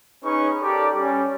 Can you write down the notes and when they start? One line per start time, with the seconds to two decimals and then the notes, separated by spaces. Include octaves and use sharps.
0.25 C#4 D#4 G#4 B4 C#6
0.61 G4 A4 A#4 D5
0.97 G3 C#4